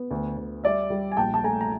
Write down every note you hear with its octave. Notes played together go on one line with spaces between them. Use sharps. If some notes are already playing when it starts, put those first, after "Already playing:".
Already playing: B3
D2
D2
G3 D5 E5
G3
G#5
A#1 G5 A5
A5
A3 G#5 A#5
A#5